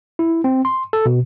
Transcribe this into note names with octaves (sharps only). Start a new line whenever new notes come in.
E4
C4
C6
A4
B2